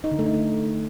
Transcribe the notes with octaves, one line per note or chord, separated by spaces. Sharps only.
D#4
D3
A3
D#4
A3